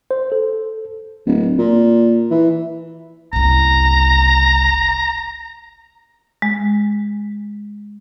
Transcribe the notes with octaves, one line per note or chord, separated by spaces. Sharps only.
C5
A4
D1
A#2
E3
F#1 C2 A#5
G#3